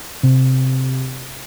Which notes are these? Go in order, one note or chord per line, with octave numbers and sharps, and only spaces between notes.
C3